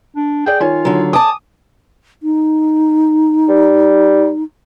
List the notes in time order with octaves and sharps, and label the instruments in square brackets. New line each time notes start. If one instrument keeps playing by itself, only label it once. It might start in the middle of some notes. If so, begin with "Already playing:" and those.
[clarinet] D4
[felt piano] G#4 D5 [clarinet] G5
[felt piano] D#3 C#5 G#5 [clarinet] F4
[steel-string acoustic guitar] D3 F#3
[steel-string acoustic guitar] G#5 A5 [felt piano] D6 [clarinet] D#6
[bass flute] D#4
[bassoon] G3